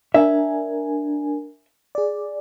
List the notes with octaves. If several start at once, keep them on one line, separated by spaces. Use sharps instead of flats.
D4 A#4 E5 G#5
G#4 D5